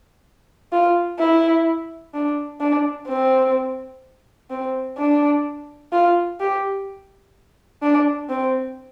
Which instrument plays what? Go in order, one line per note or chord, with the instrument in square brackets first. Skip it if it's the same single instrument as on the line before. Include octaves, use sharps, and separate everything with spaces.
[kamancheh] F4
E4
D4
D4
C4
C4
D4
F4
G4
D4
C4